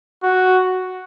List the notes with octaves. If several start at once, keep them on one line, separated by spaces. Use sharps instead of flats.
F#4